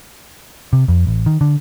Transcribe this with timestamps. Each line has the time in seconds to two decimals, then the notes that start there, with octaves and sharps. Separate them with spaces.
0.73 C3
0.88 F2
1.07 A1
1.26 D#3
1.41 D3